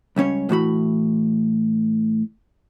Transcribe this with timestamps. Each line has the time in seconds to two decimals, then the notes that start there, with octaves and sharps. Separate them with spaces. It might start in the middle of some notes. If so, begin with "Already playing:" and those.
0.16 C#2 G3 C#4 C#5
0.49 A2 E3 F#4 B5